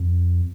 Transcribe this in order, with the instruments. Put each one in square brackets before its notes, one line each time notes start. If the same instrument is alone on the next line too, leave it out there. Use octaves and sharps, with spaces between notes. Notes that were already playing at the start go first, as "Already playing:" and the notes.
Already playing: [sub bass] F2